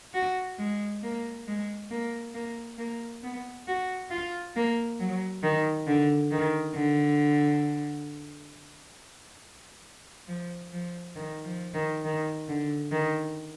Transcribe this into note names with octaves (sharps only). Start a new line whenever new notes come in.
F#4
G#3
A#3
G#3
A#3
A#3
A#3
B3
F#4
F4
A#3
F#3
D#3
D3
D#3
D3
F3
F3
D#3
F3
D#3
D#3
D3
D#3